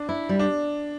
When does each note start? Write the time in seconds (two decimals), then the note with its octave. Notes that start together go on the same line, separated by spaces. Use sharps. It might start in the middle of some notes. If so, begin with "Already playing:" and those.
Already playing: D4
0.09 E4
0.29 G3
0.39 D4